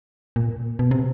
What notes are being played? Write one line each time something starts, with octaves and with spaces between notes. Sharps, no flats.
A#2
B2
C3